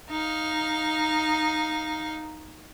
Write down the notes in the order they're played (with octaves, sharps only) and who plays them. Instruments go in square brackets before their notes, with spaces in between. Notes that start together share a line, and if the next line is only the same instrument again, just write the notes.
[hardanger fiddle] D#4 F5